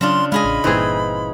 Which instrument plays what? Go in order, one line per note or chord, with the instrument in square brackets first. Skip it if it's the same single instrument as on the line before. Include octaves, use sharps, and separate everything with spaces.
[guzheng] C#3 D4 F4 [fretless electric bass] F#3 [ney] C6
[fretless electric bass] G#3 [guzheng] F4 G#4 D#5 [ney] B5
[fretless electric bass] A1
[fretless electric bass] G1 G2 A#2 [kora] E3 C4 G#4 [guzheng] D#4